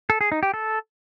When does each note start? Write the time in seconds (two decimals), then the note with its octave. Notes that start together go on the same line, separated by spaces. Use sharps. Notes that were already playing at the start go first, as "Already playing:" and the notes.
0.10 A4
0.21 G#4
0.32 D#4
0.43 G4
0.54 A4